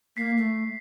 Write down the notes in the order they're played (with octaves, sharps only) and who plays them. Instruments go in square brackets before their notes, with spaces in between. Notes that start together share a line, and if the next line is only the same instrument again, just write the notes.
[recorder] A#3 [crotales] B6 C7
[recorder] A3